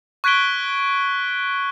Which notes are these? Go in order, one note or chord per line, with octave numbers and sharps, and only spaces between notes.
C#6 F#6 G#6 B6 D7 G7